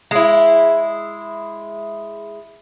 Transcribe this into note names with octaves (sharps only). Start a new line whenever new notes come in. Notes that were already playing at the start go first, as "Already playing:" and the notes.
G#3 E4